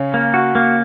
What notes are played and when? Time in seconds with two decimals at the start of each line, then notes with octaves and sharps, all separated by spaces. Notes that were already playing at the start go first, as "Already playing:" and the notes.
Already playing: C#3 C#4
0.14 A#3
0.34 F#4
0.55 A#3